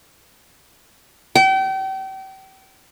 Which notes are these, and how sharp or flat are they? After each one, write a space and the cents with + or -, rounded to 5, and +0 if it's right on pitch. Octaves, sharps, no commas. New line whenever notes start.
G5 -35